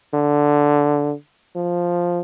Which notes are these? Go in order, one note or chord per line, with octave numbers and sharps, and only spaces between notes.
D3
F3